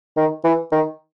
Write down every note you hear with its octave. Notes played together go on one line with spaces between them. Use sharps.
D#3
E3
D#3